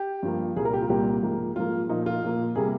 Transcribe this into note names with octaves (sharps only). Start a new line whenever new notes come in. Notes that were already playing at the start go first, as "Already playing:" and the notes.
Already playing: G4
G2 F3 A#3
C2 A#2 G3 A#3 G#4
A#4
G4
F4
C2 A#2 G3 A#3 G4
G#2 F3 A#3
G#2 F3 A#3 F4
A#2 F3 A#3 D#4
F4
A#2 F3 A#3
C3 G3 A#3 G#4